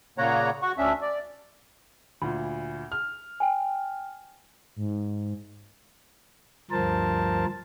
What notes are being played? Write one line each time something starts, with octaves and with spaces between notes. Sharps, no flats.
A#2 C#3 A#3 C#5 F#5 A#5
F#4 F#5 C#6
D2 C#4 D4 E5
D5
D2 A#2 B5
F6
G5 G#5
G#2
D2 G2 F3 A#4 C5 A5